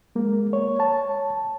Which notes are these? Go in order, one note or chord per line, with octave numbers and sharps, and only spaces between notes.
G#3 A#3
C#5
C#5 A5